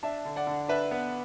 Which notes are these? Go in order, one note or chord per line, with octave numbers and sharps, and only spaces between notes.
D4 E5 A5
D3
D5 F#5
D3
D4 B4 E5
B3